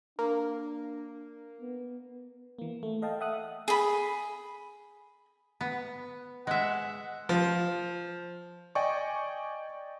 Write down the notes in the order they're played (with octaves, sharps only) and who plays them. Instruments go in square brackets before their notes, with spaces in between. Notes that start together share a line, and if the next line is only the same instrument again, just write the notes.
[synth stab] A#3 [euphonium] D4
[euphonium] B3
[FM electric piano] E3 A#3
A3
A4 D#5 F5 G5 A5
E5 F#5 D#6 F#6
[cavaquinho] G#4 B5
[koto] B3
[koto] G#3 E5 [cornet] F#5
[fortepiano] F3
[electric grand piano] D5 D#5 G5 G#5 C#6